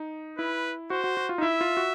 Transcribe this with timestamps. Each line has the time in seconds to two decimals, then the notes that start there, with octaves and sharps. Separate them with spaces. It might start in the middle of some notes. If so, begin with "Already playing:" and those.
Already playing: D#4
0.38 E4 B4
0.90 F#4 C5
1.04 F#4
1.17 F#4
1.29 F4
1.38 D#4
1.42 E4 E5
1.61 F4
1.77 F#4